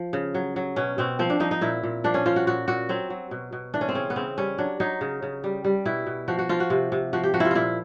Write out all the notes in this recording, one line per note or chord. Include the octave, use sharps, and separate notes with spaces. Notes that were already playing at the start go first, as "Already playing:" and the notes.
Already playing: F3
C#3
F#3
F#3
B2 C#4
B2 C4
F3 C4
D4
F3 D#4
D#4
A#2 E4
A#2
F3 D4
C#4
F3 F4
F#4
A#2 F#4
A#2 F#4
F#3 C4
F#3
B2
B2
E3 D4
C#4
C4
C#3 C#4
B3
C#3 C4
G3 C#4
F#3 D4
F#3 D#4
C#3
C#3
G3
G3
B2 E4
B2
F3 F#4
F#4
F3 F4
F#4
C3
C3
F3 F#4
G4
F3 F#4
E4 F4
A#2 E4 F4